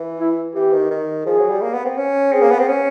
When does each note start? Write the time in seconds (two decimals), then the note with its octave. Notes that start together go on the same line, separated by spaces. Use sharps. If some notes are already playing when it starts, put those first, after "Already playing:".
Already playing: E3
0.20 E4
0.55 E3 G4
0.73 D#3
0.90 D#3
1.26 F3 G#4
1.38 F#3
1.50 G3
1.62 A#3
1.73 B3
1.85 C4
1.97 C#4
2.32 C4 G#4
2.42 A#3
2.51 B3
2.59 C4
2.68 C#4